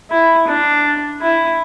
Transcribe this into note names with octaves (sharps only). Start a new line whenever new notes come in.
E4
D4
E4